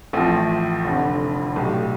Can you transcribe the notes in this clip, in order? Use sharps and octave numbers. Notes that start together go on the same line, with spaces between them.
A1 A2 F3 C4 E4
F1 F2 D3
B1 A2 G3